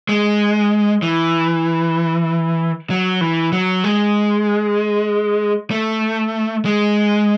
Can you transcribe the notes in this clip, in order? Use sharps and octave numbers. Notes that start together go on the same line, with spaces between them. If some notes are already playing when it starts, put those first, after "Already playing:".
G#3
E3
F#3
E3
F#3
G#3
A3
G#3